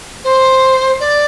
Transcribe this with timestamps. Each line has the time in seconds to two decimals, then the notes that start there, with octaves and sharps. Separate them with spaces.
0.24 C5
1.00 D5